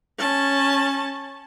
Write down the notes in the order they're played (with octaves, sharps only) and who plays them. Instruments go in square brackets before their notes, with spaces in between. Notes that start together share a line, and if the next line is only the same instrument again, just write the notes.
[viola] C#4 A5